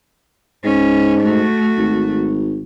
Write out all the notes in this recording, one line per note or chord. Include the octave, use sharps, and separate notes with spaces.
G#2 C#4
A3 F#4
G#1